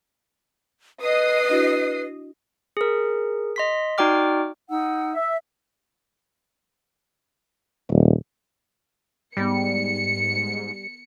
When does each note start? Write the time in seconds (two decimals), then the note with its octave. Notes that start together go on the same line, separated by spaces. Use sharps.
1.01 B4 D#5 D#6 C7
1.50 D4 E4 F#4
2.77 G#4 A#4
3.56 D#5 C6 B6
3.98 D#4 F#4 D5 G5 D6 F6
4.69 D#4 F#5 E6
5.15 E5
7.91 D#1
9.37 G#2 G3 B3 A#6 C#7